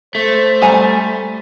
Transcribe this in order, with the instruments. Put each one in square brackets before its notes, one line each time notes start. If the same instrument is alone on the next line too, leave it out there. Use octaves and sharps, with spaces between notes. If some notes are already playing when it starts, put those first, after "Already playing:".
[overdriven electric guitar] A3 [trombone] C5
[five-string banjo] G3 G#5 A#5